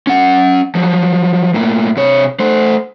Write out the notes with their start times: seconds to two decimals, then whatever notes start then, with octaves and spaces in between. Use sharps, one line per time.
0.07 C#4 F#5
0.75 F3 F#3
1.54 A2 A#3
1.97 C3 C#5
2.40 A3 C5